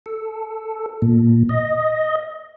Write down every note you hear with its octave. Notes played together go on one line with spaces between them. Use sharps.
A4
A#2
D#5